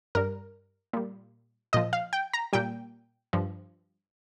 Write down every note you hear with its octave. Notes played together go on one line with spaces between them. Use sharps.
G2 G3 A#4
A#2 G3
A#2 F3 D#5
F5
G5
A#5
A#2 G3 G5
G2 F3